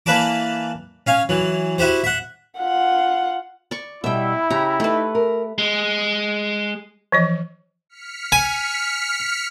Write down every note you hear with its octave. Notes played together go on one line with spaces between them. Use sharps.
E3 A#3 B4 D5 A5 D6
C#4 F5 G#5
E3 F#3
E4 F#4 G4 C5
E5 F#5
F4 F#5
D5 C#6
B2 G3 E4 E5 G5
C#3 G4 A#5
A3 D#4 B4
A#4
G#3
E3 F3 D#5
F6 B6 C#7
G#5